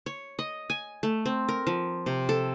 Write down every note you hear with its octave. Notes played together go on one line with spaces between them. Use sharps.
C#5
D#5
G#5
A3
C4
A#4
F3
C3
A4